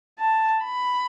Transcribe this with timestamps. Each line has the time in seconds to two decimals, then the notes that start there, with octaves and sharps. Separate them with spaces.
0.19 A5
0.65 B5